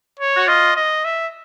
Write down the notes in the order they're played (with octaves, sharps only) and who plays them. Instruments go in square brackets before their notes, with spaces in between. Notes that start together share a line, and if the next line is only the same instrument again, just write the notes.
[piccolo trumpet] C#5
[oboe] F#4
[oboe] F4 [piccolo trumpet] D#5
[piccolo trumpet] D#5
E5